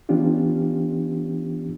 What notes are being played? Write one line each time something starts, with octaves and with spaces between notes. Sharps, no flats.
E3 B3 C#4 D4 F4 G4